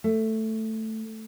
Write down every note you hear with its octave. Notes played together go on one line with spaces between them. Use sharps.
A3